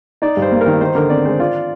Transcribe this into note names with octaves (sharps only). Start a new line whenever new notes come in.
D#4 D5
G2
C5
A#3
A#4
D#3
D#4 C5
D3 A#4
C4 D5
G#3 C5
F4 D5